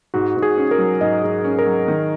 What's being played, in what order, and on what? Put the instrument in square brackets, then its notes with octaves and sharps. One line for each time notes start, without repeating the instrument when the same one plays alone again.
[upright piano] G#2 [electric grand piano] F#4
[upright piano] G#2
[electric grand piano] G#4
[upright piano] C#4
[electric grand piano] A#4
[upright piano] F#3
[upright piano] G#2 [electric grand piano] D#5
[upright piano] G#2
C#4
[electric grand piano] A#4
[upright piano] F#3
D#3